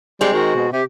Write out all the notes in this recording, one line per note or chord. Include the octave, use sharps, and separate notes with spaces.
G3 G#3 C4
D#3 F#4
B2
C3 G4